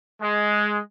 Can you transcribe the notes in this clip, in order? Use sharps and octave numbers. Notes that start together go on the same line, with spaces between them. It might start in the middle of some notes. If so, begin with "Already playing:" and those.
G#3